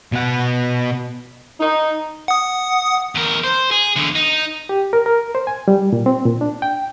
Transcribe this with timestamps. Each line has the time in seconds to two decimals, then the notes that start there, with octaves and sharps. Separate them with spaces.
0.12 B2 F#5
1.60 D#4
2.28 F#5 D#6
3.15 E2 A#4
3.44 C5
3.71 G#4
3.96 E2 D3
4.15 D#4
4.69 G4
4.93 A#4
5.06 A#4
5.35 C5
5.47 G#5
5.68 G3
5.93 A#2
6.06 C4
6.25 A#2
6.41 D4
6.62 G5